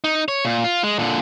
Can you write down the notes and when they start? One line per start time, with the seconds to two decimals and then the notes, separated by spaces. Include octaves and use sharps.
0.04 D#4
0.28 C#5
0.45 A#2
0.64 F4
0.84 G#3
0.99 A#2 D3